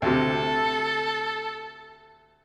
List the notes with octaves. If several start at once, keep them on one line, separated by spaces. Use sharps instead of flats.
D2 C3 A4